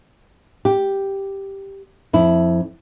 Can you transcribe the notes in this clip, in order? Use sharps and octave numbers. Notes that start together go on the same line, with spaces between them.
G4
F2 E4